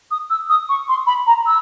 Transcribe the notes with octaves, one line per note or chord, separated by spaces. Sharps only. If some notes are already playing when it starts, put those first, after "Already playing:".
D#6
E6
D#6
C#6
C6
B5
A#5
E6